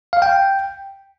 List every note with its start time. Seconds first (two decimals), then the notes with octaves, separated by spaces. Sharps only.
0.13 F5
0.22 G5